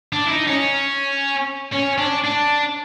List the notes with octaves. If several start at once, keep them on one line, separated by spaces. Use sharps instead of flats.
D4
E4
D#4
C#4
C#4
D4
D4